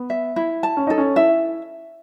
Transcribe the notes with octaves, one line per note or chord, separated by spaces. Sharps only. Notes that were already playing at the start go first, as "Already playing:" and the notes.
Already playing: B3
E5
E4
A5
C#4
D#4 A4
C#4
E4 E5